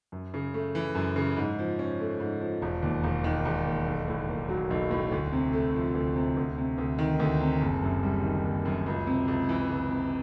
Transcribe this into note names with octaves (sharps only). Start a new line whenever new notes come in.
F#2
C#3
A3
E3
F#2
C#3
G#2
F3
C#4
A3
G#2
F3
E1
D#2
E1
D#3
E1
D#2
B1
A2
A#3
F#3
B1
A2
D2
C3
A3
F3
D2
C3
D2
C3
D2
D#3
D2
C3
F#1
F#2
G3
D#3
F#1
F#2
C#2
C3
C#2
E3
C#2
C3